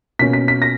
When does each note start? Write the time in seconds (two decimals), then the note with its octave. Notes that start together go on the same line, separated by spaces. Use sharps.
0.19 B2 A#3 C#4 B6
0.33 B6
0.48 B6
0.62 A#6